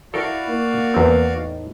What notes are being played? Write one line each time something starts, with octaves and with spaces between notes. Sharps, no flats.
E4 F#4 A4 A#4 D5 F5 G5
A#3
E2 C4
A2 D#4